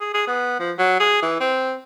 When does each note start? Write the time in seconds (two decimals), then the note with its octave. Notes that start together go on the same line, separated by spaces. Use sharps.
0.01 G#4
0.14 G#4
0.27 B3
0.59 F3
0.79 F#3
1.00 G#4
1.22 E3
1.40 C4